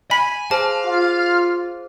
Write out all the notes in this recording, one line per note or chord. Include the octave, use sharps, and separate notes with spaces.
G#5 B5 B6
G#4 C5 F5 A5
F4